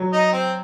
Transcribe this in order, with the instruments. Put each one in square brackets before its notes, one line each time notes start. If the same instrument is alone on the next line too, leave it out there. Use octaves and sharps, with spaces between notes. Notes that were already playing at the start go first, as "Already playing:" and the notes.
Already playing: [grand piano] F#3
[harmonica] D#4
C4